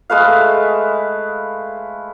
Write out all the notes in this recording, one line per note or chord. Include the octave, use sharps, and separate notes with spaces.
G#3 A3 B4 F5